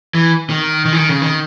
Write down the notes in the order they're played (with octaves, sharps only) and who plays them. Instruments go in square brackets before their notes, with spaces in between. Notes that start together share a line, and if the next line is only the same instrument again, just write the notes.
[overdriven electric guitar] E3
D#3
D#3
E3
D#3
C#3
D#3